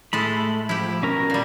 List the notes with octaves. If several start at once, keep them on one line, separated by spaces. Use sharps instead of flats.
A2 G#3 A3 A4 B5
F3 E4 G4
B2 C#4 A#4
A#2 G3